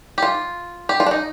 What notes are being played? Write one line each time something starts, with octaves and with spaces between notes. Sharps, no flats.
G4
F4
G4
F4
D4
D#4